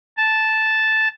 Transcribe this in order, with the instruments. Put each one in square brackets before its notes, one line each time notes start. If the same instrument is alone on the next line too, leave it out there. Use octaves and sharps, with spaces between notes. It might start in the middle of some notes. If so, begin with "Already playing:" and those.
[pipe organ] A5